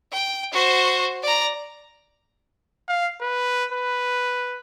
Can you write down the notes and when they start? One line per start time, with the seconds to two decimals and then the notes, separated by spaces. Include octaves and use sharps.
0.12 G5
0.52 F#4 C5
1.23 D5 A#5
2.88 F5
3.21 B4
3.72 B4